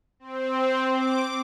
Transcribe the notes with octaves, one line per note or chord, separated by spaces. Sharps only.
C4
D6